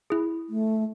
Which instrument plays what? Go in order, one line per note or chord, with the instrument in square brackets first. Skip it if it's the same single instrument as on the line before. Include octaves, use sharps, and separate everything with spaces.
[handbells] E4 G#4
[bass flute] A3